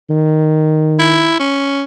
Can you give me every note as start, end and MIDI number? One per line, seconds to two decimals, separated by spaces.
0.10 1.33 51
0.99 1.39 64
1.39 1.82 61